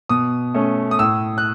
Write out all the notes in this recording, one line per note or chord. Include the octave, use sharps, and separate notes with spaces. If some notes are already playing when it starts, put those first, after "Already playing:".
B2 D#6
A3 C#4
D#6
A2 E6
F#6